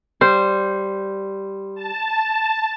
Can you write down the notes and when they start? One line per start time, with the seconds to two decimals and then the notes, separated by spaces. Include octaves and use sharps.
0.21 G3 C5
1.75 A5